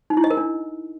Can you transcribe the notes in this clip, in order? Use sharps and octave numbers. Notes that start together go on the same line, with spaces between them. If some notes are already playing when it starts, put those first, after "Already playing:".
D#4
E4
D#5
A#4
D4